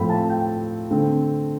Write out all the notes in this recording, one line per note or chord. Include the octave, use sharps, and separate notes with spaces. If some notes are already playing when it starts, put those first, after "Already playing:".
Already playing: A2 F3 A3 C4 B5
A5
G5
D3 A3 C4